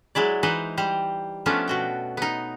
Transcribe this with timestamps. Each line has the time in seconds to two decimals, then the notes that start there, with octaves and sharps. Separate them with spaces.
0.15 F#3 G#3 E4 D5
0.43 E3 D#4 B4 C5
0.77 G3 G4 C5
1.46 F3 A3 B3 C#4 D4 F4
1.68 B2 F#4 G5
2.17 B3 D#4